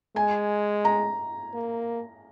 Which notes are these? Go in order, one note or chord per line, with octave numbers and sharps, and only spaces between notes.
G#3 G#5
A#5
A#3